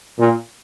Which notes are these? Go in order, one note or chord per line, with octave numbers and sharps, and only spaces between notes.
A#2